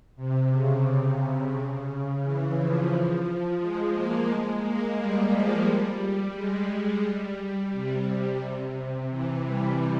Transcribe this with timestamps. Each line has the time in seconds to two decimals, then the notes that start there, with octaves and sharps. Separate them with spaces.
0.16 C3
0.50 C#3
2.22 E3
2.57 F3
3.59 G#3
3.94 A#3
4.28 G#3
4.63 A#3
4.97 G3
5.32 F3
5.66 G3
6.35 G#3
7.03 G3
7.38 G3
7.72 C3
9.10 E3
9.45 G3